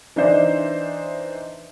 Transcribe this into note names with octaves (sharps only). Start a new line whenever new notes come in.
E3 D4 D#4 C5 D5 E5